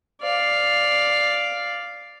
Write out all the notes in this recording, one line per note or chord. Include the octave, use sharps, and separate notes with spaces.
D5 F5